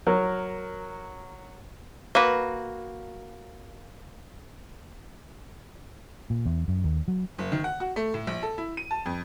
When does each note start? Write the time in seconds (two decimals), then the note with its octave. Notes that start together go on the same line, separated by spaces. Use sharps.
0.07 F#3 A#4
2.15 A#3 F#4 B4
6.30 A#2
6.46 E2
6.68 F#2
6.84 D#2
7.08 F#3
7.38 F#1
7.52 D#3
7.64 F#5
7.80 F#4
7.96 A3
8.14 A2
8.27 A#1
8.43 A4
8.58 E4
8.77 D#7
8.91 A5
9.06 F2